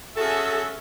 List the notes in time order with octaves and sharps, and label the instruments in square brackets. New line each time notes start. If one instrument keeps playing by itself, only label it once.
[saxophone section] C#4 F#4 A4 [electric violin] G#4 E5